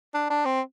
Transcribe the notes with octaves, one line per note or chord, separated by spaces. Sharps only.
D4
D4
C4